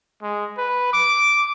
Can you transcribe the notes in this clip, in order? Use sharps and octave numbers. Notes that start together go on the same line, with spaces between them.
G#3
B4
D6